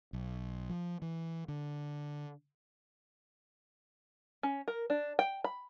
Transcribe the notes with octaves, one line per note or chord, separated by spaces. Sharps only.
B1
F3
E3
D3
C#4
A#4
D4
G5
B5